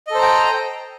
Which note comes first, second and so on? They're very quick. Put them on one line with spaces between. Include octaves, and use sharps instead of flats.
D#5 A4 C5 A#5 G5